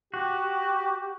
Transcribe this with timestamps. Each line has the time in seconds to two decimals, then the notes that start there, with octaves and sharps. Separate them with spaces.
0.14 F#4 G4